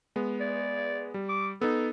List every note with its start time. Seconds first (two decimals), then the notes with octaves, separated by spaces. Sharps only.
0.16 G#3 B3
0.41 D5
1.14 G3
1.29 D6
1.61 B3 D#4 A4